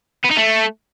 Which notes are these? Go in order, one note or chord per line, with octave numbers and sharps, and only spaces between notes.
B3
D#4
A3